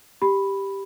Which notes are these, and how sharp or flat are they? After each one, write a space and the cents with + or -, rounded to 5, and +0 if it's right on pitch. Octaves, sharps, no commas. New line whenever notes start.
G4 +0 B5 +0